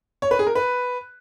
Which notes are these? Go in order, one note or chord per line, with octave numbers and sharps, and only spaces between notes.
C#5
B4
G#4
A#4
B4